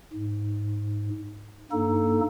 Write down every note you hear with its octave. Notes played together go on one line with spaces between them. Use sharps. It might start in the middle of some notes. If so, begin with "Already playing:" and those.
G#2
G2 A#3 D#4 A4